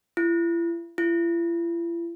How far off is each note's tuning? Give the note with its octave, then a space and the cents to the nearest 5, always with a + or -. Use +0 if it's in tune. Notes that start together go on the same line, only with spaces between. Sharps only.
E4 +40
E4 +45